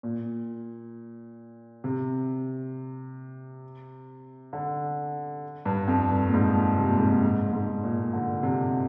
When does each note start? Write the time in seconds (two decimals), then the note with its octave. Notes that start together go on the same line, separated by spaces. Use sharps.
0.03 A#2
1.84 C3
4.53 D3
5.65 G2
5.88 F2
6.11 G2
6.27 A#2
6.34 G#2
6.78 C3
6.88 A#2
6.98 G#2
7.06 A#2
7.23 G#2
7.53 G#2
7.84 A#2
8.13 D3
8.43 C3